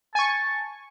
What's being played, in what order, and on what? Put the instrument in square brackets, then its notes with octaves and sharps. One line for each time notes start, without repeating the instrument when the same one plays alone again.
[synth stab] G#5 C#6 [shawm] A5